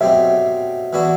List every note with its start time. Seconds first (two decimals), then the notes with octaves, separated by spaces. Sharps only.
0.01 B2 F#3 A3 C4 G4 E5
0.93 E3 B3 D4 F#4 A4